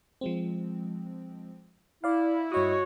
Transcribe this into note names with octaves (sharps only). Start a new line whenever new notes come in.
F3 G#3 C4
E4 D5 F5
G2 F#4 C#5 D#5 D#6